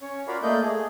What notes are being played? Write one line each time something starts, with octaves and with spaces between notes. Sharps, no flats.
C#4 C#5
F4 F#4 A#4 D5 F5 B5
A3 A#3 D5 D#5 G6
A3 G#4